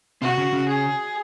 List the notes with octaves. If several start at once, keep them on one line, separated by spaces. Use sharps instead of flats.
C3 C4 F#4
C#3 C#4
C#3 C#4
G#4